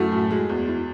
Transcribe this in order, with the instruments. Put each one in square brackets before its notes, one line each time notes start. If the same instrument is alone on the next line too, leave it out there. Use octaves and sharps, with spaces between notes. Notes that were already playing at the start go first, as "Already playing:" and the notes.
Already playing: [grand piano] F#2 A3 [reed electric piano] E4 F#4
[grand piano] A2
G#3
E2
E3